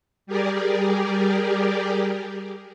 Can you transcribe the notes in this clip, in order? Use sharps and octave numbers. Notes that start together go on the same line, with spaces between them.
G3 G4 G#4 A#4 D5